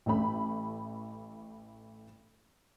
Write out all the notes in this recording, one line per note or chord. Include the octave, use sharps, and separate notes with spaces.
A1 A3 B5